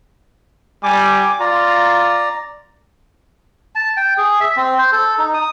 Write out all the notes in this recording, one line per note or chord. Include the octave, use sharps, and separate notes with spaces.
G3 G#5 D6
F4 D5 A#5
A5
G5
G#4
E5
C4
C5
A4
D#4
D#6